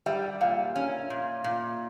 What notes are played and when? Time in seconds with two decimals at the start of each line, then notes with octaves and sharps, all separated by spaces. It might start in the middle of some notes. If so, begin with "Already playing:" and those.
0.06 G3 E5
0.41 A#2 F5
0.76 C#4
1.10 A#2
1.44 A#2